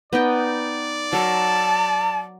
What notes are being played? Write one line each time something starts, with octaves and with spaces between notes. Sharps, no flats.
B3 D#4 D5 G5
F#3 A#4 A5